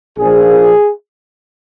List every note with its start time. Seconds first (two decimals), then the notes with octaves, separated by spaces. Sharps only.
0.18 A#1 A#2 F3 G#4